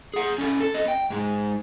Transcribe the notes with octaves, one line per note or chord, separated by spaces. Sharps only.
G#4 F#5
C#4 A4
A4
C4 D#5
G5
G#2 G#3